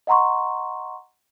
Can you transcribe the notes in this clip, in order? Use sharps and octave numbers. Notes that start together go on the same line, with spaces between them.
D#5 F#5 A#5 C6 C#6